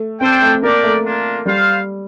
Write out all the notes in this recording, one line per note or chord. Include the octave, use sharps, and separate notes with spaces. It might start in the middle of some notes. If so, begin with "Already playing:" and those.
Already playing: A3
C4 D4 A4 C5 G5
A3
A#3 D4 G4 A#4 D5
A3
A#3 D4 F4
G3 F4 C5 F5